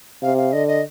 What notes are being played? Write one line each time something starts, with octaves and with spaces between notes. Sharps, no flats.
C3 F5
F5
D3 D#5
D#5